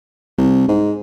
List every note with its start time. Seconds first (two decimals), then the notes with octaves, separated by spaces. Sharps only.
0.38 C2
0.68 G#2